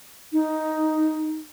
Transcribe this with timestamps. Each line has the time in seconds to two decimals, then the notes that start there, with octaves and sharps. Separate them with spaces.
0.33 D#4